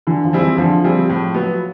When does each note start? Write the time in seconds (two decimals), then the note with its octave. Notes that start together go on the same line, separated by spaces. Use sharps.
0.07 D3 E3
0.25 F3
0.33 G3 C4 E4 G#4
0.41 E3
0.58 D3 F3
0.84 G3 C4 E4 G#4
1.10 A2 F3
1.34 F#3 B3